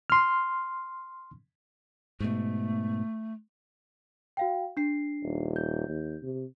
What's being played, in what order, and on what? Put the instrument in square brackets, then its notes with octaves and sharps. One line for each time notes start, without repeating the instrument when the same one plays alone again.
[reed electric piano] C6 F6
[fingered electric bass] G#2 B2 [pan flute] A3
[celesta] F#4 F5 G5
D4 C7
[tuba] D#1
[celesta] G6
[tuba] D#2
C3